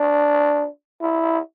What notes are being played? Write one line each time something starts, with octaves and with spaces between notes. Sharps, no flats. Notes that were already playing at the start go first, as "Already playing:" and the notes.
Already playing: D4
E4